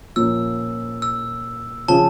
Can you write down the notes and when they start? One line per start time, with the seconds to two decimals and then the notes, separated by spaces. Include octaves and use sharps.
0.16 A#2 F3 A#3 C#4 E6
1.02 E6
1.88 C#3 F3 C#4 A5